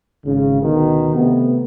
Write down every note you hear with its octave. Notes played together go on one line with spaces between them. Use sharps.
G#1 C#3
D2 B2 D#3
C3 A3 B3